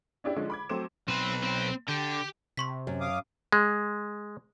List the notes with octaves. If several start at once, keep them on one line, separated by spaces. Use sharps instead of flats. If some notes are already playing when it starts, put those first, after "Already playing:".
C#4 D4 E4 G4
D3 F3 G#3 C#4
B5 D6 G#6
F#3 A3 C4 C5 D6 E7
B1 C4 B4
C4 C5
D3 G4 G5
C3 C6 C#6 B6
F#2
F5 D6 D#6
G#3